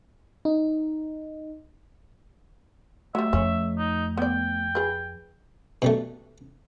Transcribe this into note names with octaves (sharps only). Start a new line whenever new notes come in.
D#4
F#3 G3 A3 E5
F2 C#4
D#4
B3 D5 G5
G#4 B4
B2 G3 A3